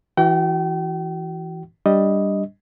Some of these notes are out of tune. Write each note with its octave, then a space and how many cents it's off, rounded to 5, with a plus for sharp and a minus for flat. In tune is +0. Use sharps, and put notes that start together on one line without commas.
E3 +0 F#4 +25 G5 -35
G3 +0 D4 +0 D#5 +5